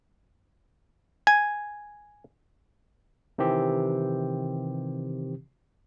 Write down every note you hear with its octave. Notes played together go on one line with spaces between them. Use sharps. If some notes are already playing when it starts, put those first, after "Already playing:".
G#5
C3 D#3 E3 C4 G4